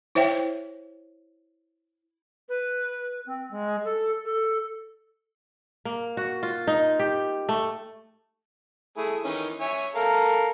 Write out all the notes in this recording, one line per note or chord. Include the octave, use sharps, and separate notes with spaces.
E4 C5 C#5 E5 G5
B4
C4
G#3
A4
A4
A#3
F#4
F4
D#4
G4
A3
A3 E4 G#4
D#3 E3 C#4
C#5 E5 G#5
A4 A#4 F5